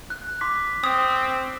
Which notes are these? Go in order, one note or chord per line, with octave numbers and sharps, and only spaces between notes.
F#6
C6 D6 B6
C4 D#6